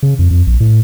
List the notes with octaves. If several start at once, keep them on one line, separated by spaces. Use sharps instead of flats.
C#3
F2
F2
A#1
A2